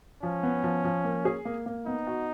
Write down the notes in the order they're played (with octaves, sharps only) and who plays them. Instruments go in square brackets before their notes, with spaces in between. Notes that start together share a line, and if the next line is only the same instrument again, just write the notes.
[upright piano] F3 [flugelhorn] C#4
[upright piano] B3
F3
F3
A#3
G#4
A#3
A#3
[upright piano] B3 [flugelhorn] D#4
[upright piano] F#4